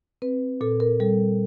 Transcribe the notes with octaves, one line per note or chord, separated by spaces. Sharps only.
C4 B4
A#2 A4
A#4
G3 A4